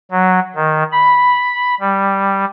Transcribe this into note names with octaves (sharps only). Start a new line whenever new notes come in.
F#3
D#3
B5
G3